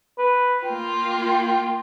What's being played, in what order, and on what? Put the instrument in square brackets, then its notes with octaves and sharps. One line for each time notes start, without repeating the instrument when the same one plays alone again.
[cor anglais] B4
[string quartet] A#3 F4 [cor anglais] G5